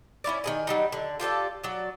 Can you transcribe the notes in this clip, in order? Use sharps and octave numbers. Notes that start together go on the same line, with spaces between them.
C#4 E4 C#5 D5
D#3 G#3 G#5
F#3 G3 D#4
D3
F4 G4 A4 D5
F#3 D5